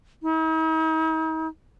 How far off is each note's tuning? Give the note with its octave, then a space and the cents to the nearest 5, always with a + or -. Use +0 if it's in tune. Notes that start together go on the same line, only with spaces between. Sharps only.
D#4 +45